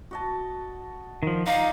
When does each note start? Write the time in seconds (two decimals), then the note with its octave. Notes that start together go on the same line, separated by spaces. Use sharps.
0.11 F#4 D#5 A5
1.23 D#3 F3
1.46 D#4 D5 F5 A#5